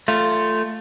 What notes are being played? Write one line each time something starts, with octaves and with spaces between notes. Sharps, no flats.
A3 F4